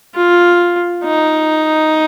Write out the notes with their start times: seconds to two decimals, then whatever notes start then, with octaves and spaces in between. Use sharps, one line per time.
0.14 F4
1.04 D#4